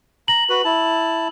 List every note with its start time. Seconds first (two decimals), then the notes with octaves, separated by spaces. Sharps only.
0.28 A#5 F#7
0.50 F#4 B4
0.64 E4 A5